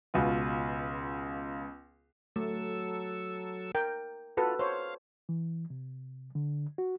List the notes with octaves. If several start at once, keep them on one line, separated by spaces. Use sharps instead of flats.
C#2 B2 B3 F4
F#3 A3 A4 E6
A#4 G5
F4 F#4 A4 B4
C5 C#5 F5
E3
C3
D3
F#4